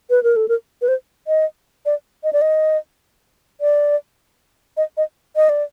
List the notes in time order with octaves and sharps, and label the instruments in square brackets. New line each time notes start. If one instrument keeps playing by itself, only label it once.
[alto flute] B4
A#4
A4
A#4
B4
C5
D#5
D5
D#5
D5
D#5
D5
D#5
D#5
D#5
D5